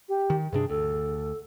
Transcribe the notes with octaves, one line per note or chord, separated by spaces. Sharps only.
G4
D#3
G2 C3 D4 G#4
D2 A4